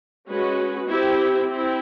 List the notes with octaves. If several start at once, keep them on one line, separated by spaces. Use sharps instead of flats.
G#3 C#4 F#4 B4
C4 E4 G4
C4 E4